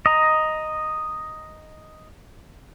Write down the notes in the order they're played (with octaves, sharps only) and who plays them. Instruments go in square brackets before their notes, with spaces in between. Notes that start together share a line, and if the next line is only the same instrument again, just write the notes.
[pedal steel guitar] D#5 A#5